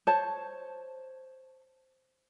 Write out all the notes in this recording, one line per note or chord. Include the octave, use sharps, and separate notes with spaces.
C5 C#5 A5